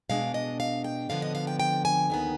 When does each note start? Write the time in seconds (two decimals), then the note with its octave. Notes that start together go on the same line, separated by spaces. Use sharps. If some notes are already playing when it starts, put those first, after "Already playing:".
0.09 B2 G#3 D4 F5
0.34 D#5
0.60 F5
0.84 G5
1.09 F2 D3 F3 B3 F5
1.22 D#5
1.35 F5
1.47 G5
1.60 G5
1.85 G#5
2.10 D#2 D#3 B3